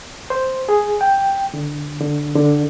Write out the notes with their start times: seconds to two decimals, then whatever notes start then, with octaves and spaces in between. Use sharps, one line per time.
0.30 C5
0.69 G#4
1.01 G5
1.54 D3
2.00 D3
2.35 D3